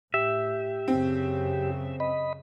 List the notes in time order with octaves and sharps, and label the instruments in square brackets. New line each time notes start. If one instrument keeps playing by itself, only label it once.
[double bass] A2 [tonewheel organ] G4 [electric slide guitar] E5
[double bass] F#2 C#3 [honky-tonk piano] C4
[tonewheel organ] D#5 B5